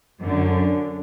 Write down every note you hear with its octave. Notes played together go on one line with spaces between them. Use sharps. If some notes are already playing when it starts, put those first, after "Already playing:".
F#2 D3